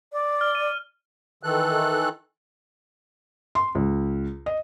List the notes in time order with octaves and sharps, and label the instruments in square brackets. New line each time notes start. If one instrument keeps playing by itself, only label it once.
[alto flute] D5
[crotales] F6
D#7
[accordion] D#3 E3 A4 F#6
[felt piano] C6
C#2
D#5